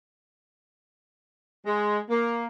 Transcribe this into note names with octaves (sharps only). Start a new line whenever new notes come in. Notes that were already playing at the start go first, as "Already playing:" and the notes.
G#3
A#3